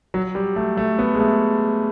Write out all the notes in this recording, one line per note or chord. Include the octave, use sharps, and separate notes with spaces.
F#3
G3
A3
A3
B3
G#3
A3